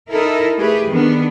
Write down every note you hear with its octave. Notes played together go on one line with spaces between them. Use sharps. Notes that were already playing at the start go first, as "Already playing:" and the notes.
D#4 E4 A4 A#4
A3 G4 G#4 B4
D#3 B3 D4